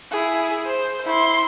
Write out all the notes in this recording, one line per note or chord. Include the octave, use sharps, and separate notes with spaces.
E4 G#4
C5
E4 C6